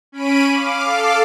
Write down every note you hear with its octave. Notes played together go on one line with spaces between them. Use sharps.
C#4 B5 D7 D#7
F5 D6
A4 F5 D6